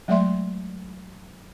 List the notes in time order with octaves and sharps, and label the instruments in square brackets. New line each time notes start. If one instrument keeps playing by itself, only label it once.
[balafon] F#3 G#3 A3 D5 E5 C6